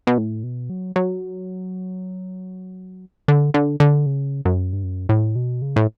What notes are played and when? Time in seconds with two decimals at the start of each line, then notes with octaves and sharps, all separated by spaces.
0.07 B2
0.18 A2
0.43 B2
0.70 F#3
0.96 F#3
3.28 D3
3.54 D3
3.80 D3
4.06 C#3
4.45 F#2
4.73 G2
4.83 F#2
5.09 A2
5.36 B2
5.62 C#3
5.76 A2